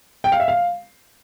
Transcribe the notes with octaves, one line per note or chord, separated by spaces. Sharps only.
G5
F5
E5
F5